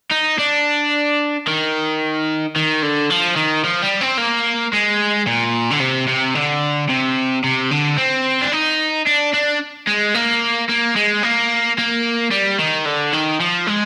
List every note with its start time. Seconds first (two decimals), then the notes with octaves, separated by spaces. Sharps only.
0.11 D#4
0.39 D4
1.48 D#3
2.56 D#3
2.83 D3
3.10 F3
3.36 D#3
3.64 F3
3.82 G3
4.01 C4
4.18 A#3
4.73 G#3
5.27 A#2
5.71 D3
5.81 C3
6.08 C3
6.35 D3
6.89 C3
7.44 C3
7.71 D3
7.98 C4
8.42 D4
8.53 D#4
9.07 D4
9.33 D4
9.87 G#3
10.14 A#3
10.69 A#3
10.96 G#3
11.23 A#3
11.78 A#3
12.31 G3
12.59 D#3
12.86 D3
13.13 D#3
13.41 F3
13.67 G#3